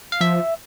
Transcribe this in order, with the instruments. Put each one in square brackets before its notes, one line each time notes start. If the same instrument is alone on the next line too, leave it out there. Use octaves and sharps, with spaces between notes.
[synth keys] F5
[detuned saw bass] F3 [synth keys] E5